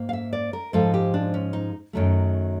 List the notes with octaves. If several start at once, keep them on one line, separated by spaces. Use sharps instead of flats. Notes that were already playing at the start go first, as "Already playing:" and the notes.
Already playing: G#2 A#3
F5
E5
D5
A#4
G#2 F3 G#3 A4
G4
D4
C#4
D#4
F#2 D#3 F#3 A3